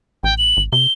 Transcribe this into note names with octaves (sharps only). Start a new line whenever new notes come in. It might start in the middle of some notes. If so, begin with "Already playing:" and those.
A1 G5
F#7
G#1
C3 G7